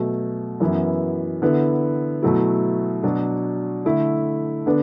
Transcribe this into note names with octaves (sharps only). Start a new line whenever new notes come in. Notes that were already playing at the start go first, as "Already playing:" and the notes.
Already playing: B2 F#3 A3
F#2 E3 B3 E4
D3 B3 E4
B2 F#3 A3 E4
B2 F#3 D4
D3 A3 E4
D3 B3 D4